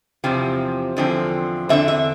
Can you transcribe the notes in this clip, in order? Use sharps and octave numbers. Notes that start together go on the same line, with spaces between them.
E2 C3 F3 C4
E2 D3 F3 C4
E2 D3 F3 C4 E5
E5